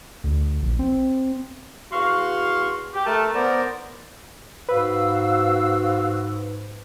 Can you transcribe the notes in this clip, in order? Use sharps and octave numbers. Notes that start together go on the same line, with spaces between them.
D2
A#1
C4
E2 F#4 F5 C6 C#6
G4
A3 A#4 A5
B3 A#4 C5 D5
G#2 F#4 B4 F5 E6